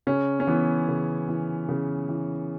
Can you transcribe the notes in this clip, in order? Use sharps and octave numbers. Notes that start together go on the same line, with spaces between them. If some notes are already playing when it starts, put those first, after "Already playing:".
C#3 C#4
C#4
E3 B3
C#3
E3
C#3
E3